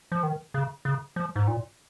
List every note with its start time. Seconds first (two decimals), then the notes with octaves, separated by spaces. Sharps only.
0.12 F3
0.23 D#3
0.54 C#3
0.85 C#3
1.16 F3
1.36 G#2
1.47 A#2